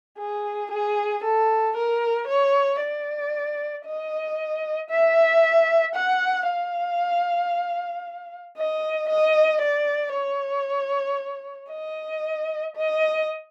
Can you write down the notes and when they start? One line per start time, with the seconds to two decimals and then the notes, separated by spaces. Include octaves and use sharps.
0.19 G#4
0.71 G#4
1.24 A4
1.76 A#4
2.28 C#5
2.81 D5
3.85 D#5
4.90 E5
5.95 F#5
6.47 F5
8.57 D#5
9.09 D#5
9.61 D5
10.14 C#5
11.70 D#5
12.76 D#5